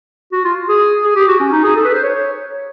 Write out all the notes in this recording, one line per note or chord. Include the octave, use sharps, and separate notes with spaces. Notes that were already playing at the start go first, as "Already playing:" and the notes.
F#4
F4
G#4
G#4
G4
F#4
C#4
D#4
G#4
A4
B4
C5
C#5